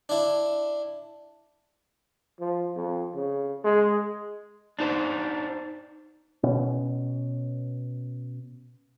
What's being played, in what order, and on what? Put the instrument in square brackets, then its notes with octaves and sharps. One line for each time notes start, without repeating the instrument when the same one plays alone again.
[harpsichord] D4 E4
[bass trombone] F3
F2
C#3
G#3
[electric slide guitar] D4 D#4 C5
[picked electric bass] B2 C#4